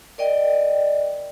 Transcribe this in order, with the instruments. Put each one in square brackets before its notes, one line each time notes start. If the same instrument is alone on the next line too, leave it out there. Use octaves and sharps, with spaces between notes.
[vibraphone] A#4 D5 D#5 G5